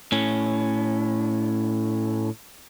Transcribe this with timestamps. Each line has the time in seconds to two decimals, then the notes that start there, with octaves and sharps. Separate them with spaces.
0.12 A2 C#4